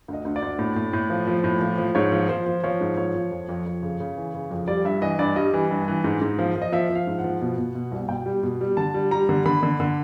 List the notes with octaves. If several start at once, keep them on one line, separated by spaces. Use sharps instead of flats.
D2 D#5
D2
D5
D2
A2
A2
A2
F3
F3
A2
F3
F3
G#2 C#5
F3
F3 C5
F3
F3 C#5
G#2
F3 C#5
F3
F2
F2
F2
C#3
C#3
E3
C#3
F2
G3 D5
G2 E5
E3 D#5
G2 D5
G3 D#5
E3
G2
E3
G#2
G#2
F3
F3
D#5
F3 E5
F3
F5
G#2
F#5
F3
B2
B2
B2
C2
B2 G5
G3
B2
G3
D3 A5
G3
G3 A#5
D3
D3 B5
D3
D3